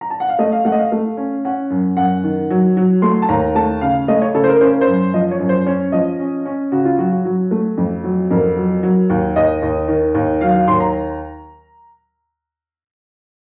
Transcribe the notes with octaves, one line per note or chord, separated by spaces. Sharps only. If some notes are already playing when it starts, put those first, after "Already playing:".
A#5
A5
F#5
F5
A3 D#5
F5
A3 F#5
D#5
F5
A3
C#4
C#4 F#5
F#2
F#2 F#5
D#3
F#3
F#3
A3 C6
A5
D#2 A#5
A3 A5
C#3 F5
A3 D#5
C#5
C#3 A4
C5
A#4
C#4 C5
A#4
C5
F#2
F3 D#5
C#5
F#2
C5
C#4 C#5
F3 D#5
C#4
C#4
C#3 F#4
F4
F#3 F#4
F#4
F#3
A3
F2
F#3
F2 A#4
F#3
F#3
D#2
D#2 D#5
D#2
D#3
D#2
F#3 F5
F5
D#2 C6
A#5